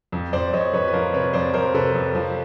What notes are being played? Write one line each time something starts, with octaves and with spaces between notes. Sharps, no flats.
F2
F2 C5 D5
F2 C#5 D#5
F2 B4 C#5
B4
F3 A#4 C5
C3 B4 C#5
F2 C5 D5
F2 A#4 C5
C3 A4 B4
F2
F3